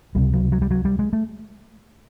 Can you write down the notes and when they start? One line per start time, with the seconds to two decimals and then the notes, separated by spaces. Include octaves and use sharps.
0.15 C#2 C3 G3
0.33 F#3
0.52 F#3
0.62 G3
0.71 F#3
0.85 G3
0.99 G#3
1.13 A3